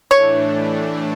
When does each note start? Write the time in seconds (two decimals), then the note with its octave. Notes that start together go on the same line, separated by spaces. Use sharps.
0.11 A2 E3 A3 D4 C#5